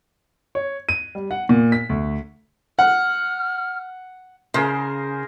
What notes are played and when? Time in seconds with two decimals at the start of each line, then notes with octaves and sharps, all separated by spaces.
0.55 C#5
0.89 D#7
1.15 G3
1.31 F#5
1.49 A#2
1.72 B6
1.89 D2
2.79 F#5 F6
4.54 C#3 G#4 A#4 C5